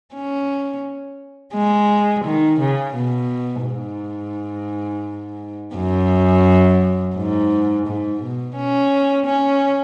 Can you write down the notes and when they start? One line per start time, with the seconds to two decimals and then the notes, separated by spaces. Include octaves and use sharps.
0.14 C#4
1.54 G#3
2.25 D#3
2.60 C#3
2.95 B2
3.66 G#2
5.76 F#2
7.16 G#2
7.87 G#2
8.22 B2
8.56 C#4
9.26 C#4